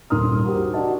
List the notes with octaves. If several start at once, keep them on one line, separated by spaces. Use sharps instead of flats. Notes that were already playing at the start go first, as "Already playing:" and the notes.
D#1 D#2 A#4 C6 D#6 F6
F#4 G4 A#4 C5
D4 F#4 D#5 A5